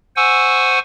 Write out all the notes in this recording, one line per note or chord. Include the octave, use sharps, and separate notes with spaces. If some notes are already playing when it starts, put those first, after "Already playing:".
C5 F#5 G#5 C#6 E6